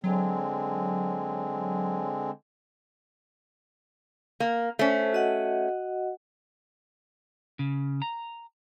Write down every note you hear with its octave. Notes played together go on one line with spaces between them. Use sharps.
D3 F#3 G#3 C4
A#3
A3 C#4 C5
F#4 D#5 F#5
C#3
A#5